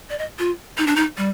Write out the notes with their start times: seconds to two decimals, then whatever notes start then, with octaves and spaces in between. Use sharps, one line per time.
0.10 D5
0.19 D#5
0.39 F4
0.78 D#4
0.87 D4
0.96 D#4
1.17 G3